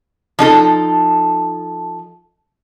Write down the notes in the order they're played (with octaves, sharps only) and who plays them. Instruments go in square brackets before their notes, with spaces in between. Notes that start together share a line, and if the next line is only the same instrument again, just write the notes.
[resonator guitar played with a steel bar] F3 D#4 A4